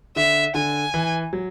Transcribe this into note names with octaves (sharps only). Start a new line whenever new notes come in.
D3 E5
D3 G#5
E3
F#3